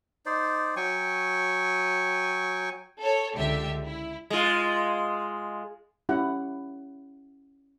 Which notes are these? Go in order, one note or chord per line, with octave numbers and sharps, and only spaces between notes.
D#4 C5 D5
F#3 G5 G#5 C#6
A4 C#5
C#2 D3 G4 E5
E4
G#3 F4
C#4 E4 G4 F#5